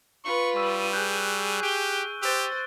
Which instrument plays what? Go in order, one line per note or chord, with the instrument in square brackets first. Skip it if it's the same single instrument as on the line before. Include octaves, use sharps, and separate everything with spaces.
[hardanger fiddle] F4 B4 [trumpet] C#6
[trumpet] G3 [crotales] C#6 E6 D#7
[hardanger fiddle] G#4 [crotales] F#6 G6
[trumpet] G4 [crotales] D7 G7
[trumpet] G4 [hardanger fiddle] C5 [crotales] E6 A6